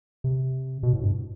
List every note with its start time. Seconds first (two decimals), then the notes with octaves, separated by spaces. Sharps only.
0.24 C3
0.83 B2
0.93 A2
1.03 G2